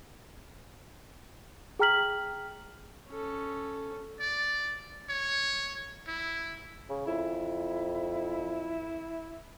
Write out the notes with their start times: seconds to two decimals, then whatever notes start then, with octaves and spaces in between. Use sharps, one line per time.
1.79 G#4 G5 A#5 F6 B6 F#7
3.09 C#4 A4
4.20 D5
5.09 C#5
6.08 E4
6.90 C#3
7.07 F2 E4